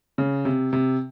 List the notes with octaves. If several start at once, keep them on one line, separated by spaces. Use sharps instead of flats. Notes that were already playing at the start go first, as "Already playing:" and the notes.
C#3
C3
C3